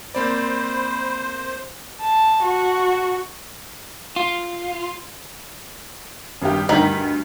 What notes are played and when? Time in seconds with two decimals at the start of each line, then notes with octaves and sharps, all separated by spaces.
0.15 A#3 C4 C5 D5 B5
2.01 A5
2.43 F#4
4.16 F4
6.42 G#1 G2 G4
6.69 D2 G2 D#3 B6